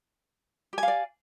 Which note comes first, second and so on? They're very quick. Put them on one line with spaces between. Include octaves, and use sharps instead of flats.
G4 G#5 F5 D5